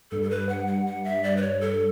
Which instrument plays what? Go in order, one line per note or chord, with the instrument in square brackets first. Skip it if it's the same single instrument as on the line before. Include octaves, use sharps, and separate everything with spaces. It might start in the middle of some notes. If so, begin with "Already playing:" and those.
[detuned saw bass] G2 [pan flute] A4
[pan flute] A4
B4
F#5
F#5
F#5
E5
D5
B4
C#5
A4